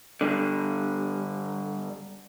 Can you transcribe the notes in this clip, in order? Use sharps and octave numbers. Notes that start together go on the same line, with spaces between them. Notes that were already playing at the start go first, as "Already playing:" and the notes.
G2 D3